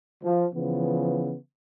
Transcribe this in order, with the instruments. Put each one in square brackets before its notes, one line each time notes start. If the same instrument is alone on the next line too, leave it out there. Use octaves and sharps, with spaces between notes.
[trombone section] F3
C#3 E3 F3 B3